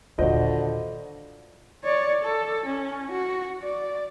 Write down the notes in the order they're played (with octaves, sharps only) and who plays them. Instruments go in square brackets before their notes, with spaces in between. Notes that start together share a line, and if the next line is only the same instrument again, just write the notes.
[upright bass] D#2 A#2 [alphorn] D3 [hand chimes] F4 [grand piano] F#4 C5 D#5
[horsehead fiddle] C#5 D5
A4
C#4
F#4
D5